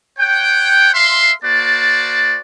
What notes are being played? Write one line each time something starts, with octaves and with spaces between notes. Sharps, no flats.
C#5 F#5 G5
E5 F5 C6
A#3 F#4 C5 D5 A5